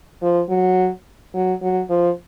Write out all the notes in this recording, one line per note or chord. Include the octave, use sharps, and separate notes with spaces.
F3
F#3
F#3
F#3
F3